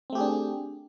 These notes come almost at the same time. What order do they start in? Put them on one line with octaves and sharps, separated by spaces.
C4 A3 G4 G#4 D4